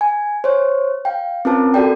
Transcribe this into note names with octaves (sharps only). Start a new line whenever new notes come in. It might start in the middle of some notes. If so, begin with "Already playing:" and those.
G#5
C5 C#5
F5 G5
C4 C#4 F4 A#4 B4 A5
F#4 A4 D5 G5